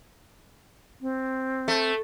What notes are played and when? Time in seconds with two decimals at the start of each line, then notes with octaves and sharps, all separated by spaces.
1.01 C4
1.68 A3